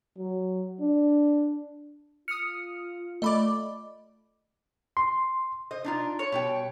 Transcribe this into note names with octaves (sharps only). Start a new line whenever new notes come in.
F#3
D4
F4 D#6 F6 C#7
A3 D5 D#5 B5 D6
C6
C5 D#5
D4 D#4 F4
C#5
B2 G3 G5